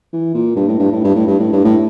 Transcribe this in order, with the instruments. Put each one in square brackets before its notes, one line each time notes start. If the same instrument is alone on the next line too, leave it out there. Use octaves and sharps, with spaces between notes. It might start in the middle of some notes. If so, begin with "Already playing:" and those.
[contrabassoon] E3
A#2
G2
A2
G2
A2
G2
A2
G2
A2
G2
A2